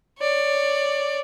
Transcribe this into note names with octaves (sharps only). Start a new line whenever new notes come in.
C#5 D5